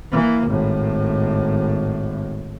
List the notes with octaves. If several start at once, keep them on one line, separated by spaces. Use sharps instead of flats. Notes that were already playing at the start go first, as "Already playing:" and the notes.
E3 A#3
G#1 A2